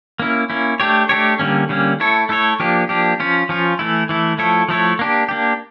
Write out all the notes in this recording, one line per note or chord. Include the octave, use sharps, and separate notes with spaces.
A#3 C#4 E4
A#3 C#4 E4
A3 D4 G4 C#5
A3 D4 G4 C#5
D3 G3 A#3 C#4
D3 G3 A#3 C#4
A3 E4 A4 C#5
A3 E4 A4 C#5
F3 A#3 D4 G4
F3 A#3 D4 G4
F3 C#4 F4
F3 C#4 F4
E3 A3 E4
E3 A3 E4
F3 A3 E4 A4 C#5
F3 A3 E4 A4 C#5
A#3 D4 G4
A#3 D4 G4